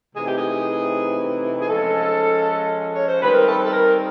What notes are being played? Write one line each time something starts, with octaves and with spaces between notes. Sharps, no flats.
C3 E3 A3 C4 D#4 G#4
G4
G#4
G#4
F3 G#3 C#4 A4
C#5
C5
D#3 G3 C4 B4
A#4
A4
A4
A#4